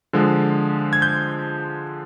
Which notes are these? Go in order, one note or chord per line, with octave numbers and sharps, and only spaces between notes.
D3 F3 G#3
G#6
G6